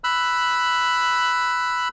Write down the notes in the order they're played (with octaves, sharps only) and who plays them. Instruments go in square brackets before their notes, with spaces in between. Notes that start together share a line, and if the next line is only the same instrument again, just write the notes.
[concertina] B5 E6 F#6